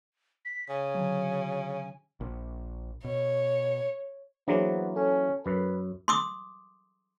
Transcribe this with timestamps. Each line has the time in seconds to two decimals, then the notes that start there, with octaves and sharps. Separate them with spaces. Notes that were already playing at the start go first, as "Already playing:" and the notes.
0.45 B6
0.69 C#3 G#5
0.95 D3 F#3
2.21 A#1
3.04 B2 C#5
4.48 E3 F#3 A#3 B3 D4 G#4 C5
4.96 C#4 A4
5.46 F#2 B4
6.08 C6 D6 D#6